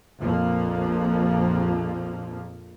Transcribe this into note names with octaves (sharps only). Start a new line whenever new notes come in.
A#1 F2 F3 A#3